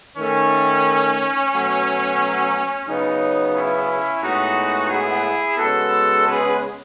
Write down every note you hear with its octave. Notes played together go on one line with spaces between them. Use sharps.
D#3 A3 C#4
B2 F#3 A3
C#3 F#3 B3 D#4
C#4 E4
A2 G#3 B3 D#4 F#4
E4 G#4
C#3 G#3 B3 F#4 A4
G#4 B4